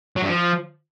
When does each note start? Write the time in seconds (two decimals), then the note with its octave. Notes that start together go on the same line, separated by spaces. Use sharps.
0.16 F#3
0.22 G2
0.28 F3